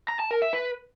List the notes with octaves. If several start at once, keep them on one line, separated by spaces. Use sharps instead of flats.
A#5
A5
A#4
E5
B4